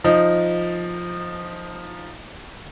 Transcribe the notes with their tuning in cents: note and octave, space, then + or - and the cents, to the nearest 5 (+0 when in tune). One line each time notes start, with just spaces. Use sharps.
F3 +5 D#4 +0